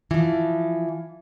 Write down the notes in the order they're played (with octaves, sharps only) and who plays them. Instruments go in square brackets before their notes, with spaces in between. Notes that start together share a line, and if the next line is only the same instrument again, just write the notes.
[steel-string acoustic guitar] E3 F3